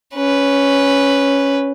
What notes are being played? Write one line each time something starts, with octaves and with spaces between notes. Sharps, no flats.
C#4 B4